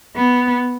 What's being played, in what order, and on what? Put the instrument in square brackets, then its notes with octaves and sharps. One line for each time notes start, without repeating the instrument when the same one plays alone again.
[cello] B3